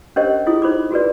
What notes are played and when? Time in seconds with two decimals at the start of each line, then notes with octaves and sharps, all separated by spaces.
0.16 C#4 D4 G4 A#4 C5 D#5
0.47 E4 F4 G#4 D#6
0.62 D#4 C5 B5 D6
0.91 F4 F#4 G#4 A#4 B4 D5